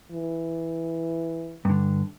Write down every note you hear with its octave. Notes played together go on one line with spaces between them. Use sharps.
E3
G2 D3